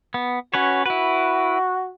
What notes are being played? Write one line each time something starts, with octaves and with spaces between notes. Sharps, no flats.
B3
C#4 F#4 B4 C#5
E4 F#4 B4